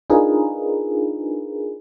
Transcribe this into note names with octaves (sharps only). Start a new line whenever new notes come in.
D4 D#4 F4 G#4 A#4 B4